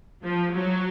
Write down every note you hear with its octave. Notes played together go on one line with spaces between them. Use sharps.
F3
F#3